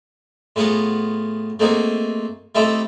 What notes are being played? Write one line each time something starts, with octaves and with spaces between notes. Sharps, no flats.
A2 B3 F4 G#4 F#5 A#5
A3 A#3 C4 D#4 F#4 G#4
A3 C4 D#4 E4 G4 A4